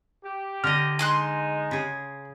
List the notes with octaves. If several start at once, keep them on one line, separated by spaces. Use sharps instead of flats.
G4
D3 D#5 F6
G#3 D#4 G#5 C6 F#6
C#3 G#4